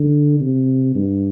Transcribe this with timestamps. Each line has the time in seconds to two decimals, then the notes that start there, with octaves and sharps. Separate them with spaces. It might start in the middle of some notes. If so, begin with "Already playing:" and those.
Already playing: D3
0.40 C3
0.95 G2